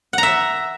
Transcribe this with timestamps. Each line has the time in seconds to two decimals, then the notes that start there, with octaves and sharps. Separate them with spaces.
0.13 F#5
0.18 A#5
0.23 E5